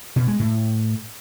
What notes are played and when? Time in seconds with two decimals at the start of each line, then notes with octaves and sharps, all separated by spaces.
0.16 B2
0.28 G#3
0.40 A2